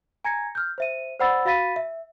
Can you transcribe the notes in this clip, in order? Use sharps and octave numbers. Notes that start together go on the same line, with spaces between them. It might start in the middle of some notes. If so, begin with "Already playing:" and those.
G#5 A#5 G#6 A#6 C#7
F6 G6
C5 E5 D#7
C5 D5 F#5 B5 E6 A6
F#4 F5 B5 A6 B6 D#7
E5